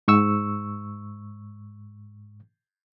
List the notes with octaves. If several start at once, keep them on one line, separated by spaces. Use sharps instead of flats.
G#2 C#6 E6